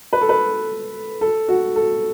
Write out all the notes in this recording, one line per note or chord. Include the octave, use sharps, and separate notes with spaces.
B4
A4
B4
A4
F#4
A4